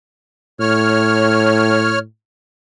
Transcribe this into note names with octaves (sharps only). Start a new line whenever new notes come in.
A2 C#5 F6